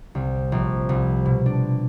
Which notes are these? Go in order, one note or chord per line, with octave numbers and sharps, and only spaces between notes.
C2
A#1
C2
B2
D4